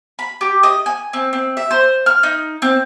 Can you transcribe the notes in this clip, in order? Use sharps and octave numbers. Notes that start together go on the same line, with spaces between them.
B5
G4
D#5
G#5
C4
C4
E5
C5
F6
D#4
C4